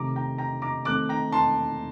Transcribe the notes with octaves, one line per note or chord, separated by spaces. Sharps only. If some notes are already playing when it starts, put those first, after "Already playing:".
Already playing: C3 D#3 A3 A#5 D6
G5 A#5
G5 A#5
A#5 D6
D#3 A3 C4 D6 F#6
G5 A#5
A5 C6